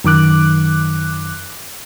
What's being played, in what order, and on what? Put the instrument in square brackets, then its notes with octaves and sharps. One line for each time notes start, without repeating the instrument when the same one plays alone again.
[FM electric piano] F#2 D#3 D6 F#6